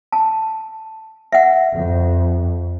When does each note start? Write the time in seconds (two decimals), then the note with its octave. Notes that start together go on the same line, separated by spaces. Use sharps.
0.12 A5
1.32 E5 F#5
1.75 F2